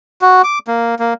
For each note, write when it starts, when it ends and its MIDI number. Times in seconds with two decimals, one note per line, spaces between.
0.21 0.42 66
0.44 0.59 86
0.67 0.95 58
0.99 1.14 58